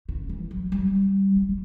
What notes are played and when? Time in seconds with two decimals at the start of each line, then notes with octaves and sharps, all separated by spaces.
0.09 C#3
0.29 E3
0.51 F#3
0.72 G3
1.36 F#3
1.49 G3